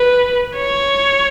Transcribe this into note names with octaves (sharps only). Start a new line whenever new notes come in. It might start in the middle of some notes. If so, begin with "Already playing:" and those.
Already playing: B4
C#5